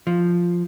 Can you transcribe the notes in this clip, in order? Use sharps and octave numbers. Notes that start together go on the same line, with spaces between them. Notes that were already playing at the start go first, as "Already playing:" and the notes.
F3